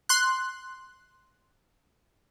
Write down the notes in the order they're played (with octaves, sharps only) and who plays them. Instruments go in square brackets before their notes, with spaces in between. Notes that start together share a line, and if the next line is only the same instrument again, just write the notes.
[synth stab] C6 F#6